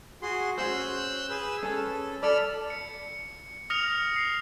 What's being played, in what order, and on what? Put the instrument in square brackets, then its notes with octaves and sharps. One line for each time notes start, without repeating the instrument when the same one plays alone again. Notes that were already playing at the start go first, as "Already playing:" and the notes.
[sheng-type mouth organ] F#4 G#4 C6
[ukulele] C#4 F#4 C5 [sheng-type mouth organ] E6 F#6 G6
[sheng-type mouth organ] G#4 B4 E6
[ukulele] C#4 [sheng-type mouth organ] A4
[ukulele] A4 D5 [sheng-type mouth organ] B5 E6 F6
[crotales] C#7
D#6 F6 A#6 C#7 F7
C7